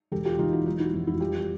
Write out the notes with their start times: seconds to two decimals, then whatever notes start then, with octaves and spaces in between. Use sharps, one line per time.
0.12 E1 G4 A4
0.25 F4 G4
0.39 E1 D#4 F4
0.53 E4 F#4
0.66 F#3 D#4 F4
0.79 E4 F#4
0.93 F2
1.07 E4 F#4
1.20 G3 F4 G4